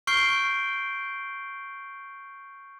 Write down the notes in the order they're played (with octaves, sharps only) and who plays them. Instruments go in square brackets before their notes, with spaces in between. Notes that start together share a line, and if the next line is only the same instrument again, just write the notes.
[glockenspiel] C#6 F6 G6 C7 D7 G7